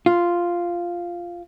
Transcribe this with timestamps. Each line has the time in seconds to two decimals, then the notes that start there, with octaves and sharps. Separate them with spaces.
0.06 F4